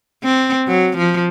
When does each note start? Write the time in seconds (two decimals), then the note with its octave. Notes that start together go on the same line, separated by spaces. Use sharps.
0.23 C4
0.67 F#3
0.97 F3